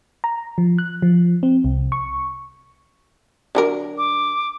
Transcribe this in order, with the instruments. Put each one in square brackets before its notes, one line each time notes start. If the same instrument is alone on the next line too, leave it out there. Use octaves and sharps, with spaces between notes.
[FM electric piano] A#5
F3
F#6
F3
C4
C2
C#6
[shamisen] D3 F#3 A#4
[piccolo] D6